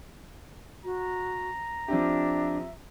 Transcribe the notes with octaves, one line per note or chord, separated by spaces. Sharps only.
F#4 A#5
F3 C4 D4 G4 E5